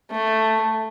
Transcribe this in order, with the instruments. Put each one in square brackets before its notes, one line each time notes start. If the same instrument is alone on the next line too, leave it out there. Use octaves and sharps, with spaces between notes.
[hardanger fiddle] A3